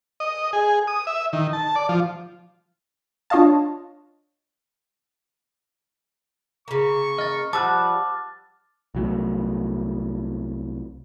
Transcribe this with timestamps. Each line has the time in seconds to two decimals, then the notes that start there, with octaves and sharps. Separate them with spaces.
0.20 D#5
0.53 G#4
0.87 D#6
1.07 E5
1.33 D#3
1.53 A5
1.76 D5
1.89 F3
3.30 D4 F4 C#5 D#5 F5 A5
6.68 C#3 A#3 C#6
7.18 D#5 F6 A6
7.53 F3 G3 F#5 A5 D6 E6 F#6 A6
8.95 C2 F#3 A3